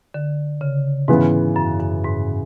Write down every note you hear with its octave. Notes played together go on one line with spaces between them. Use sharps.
D3
C#3
G#2 C#3 E3 B3
F#2
F#2
G#2